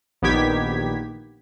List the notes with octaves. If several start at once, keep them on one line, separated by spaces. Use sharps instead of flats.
A#1 D#3 B3 G4 G#6 B6